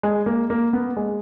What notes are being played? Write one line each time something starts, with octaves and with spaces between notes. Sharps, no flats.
G#3
A#3
A#3
B3
G#3